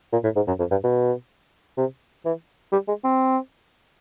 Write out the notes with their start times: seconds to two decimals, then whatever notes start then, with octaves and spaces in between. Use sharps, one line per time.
0.13 A#2
0.24 A2
0.36 G#2
0.47 F#2
0.59 F2
0.71 G2
0.84 B2
1.78 C3
2.25 E3
2.72 G3
2.88 G#3
3.04 C4